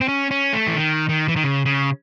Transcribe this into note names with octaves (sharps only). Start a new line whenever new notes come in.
C4
C#4
C#4
A3
E3
D#3
D#3
E3
D#3
C#3
C#3